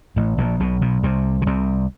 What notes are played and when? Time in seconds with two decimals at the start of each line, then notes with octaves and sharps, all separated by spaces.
0.16 A1 A2
0.38 A#1 A#2
0.60 B1 B2
0.81 B1 B2
1.03 C2 C3
1.42 C#3
1.46 C2 C3